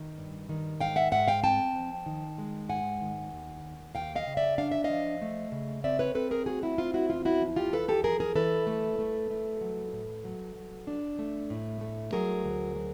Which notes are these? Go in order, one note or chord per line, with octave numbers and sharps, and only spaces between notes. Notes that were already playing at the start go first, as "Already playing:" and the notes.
Already playing: D#3
G2
D#3
G#2 F5 G5
E5 F#5
G#2 E5 F#5
F5 G5
C4 G5 A5
F3
D#3
G#3
G#2 F#5 G#5
D#3
D#2
D#2
D#2 F5 G5
D#5 F5
C#3
D5 E5
D4 F5
E5
D#5 F5
F3
A3
C#3
C4 D5 E5
B4 C#5
C4 A4 B4
G#4 A#4
A3 F#4 G#4
E4 F#4
C4 F4
E4 F#4
E2 F4
E4 F#4
F3
F4 G4
E2 A4 B4
G4 A4
F3 G#4 A#4
G#4 A#4
E3 A4 B4
A3
A3
A3
F#3
A2
F#3
F#3
D4
A3
A2
A3
F#3 G#4 A#4
D2
F#3